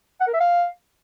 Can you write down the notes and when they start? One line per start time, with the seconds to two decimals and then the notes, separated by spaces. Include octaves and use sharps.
0.20 F#5
0.27 A#4
0.34 E5
0.40 F5